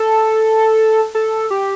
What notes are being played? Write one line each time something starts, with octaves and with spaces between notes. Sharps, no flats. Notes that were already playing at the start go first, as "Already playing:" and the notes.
Already playing: A4
A4
G4